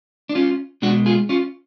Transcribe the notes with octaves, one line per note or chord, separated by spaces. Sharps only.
D4
C#4 F4
B2 G#3 B3 D4 F#4
F4 G#4
C#4 F4